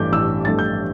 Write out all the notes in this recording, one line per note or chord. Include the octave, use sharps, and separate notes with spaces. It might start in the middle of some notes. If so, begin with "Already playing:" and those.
Already playing: A1 G2 E3 A3 D6 G6
A1 E6
G2 E3 A3 A6
G6